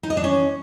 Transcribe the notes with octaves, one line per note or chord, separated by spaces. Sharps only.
D#4
D#5
D4
C#4